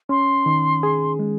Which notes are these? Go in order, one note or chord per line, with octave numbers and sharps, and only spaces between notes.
C#4 C6
D#3
G#4
G#3